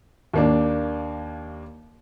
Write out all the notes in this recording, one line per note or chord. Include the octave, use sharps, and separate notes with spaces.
D#2 A#3 D4